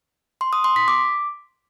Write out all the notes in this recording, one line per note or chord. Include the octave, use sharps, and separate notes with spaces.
C6
D#6
C6
B6
D6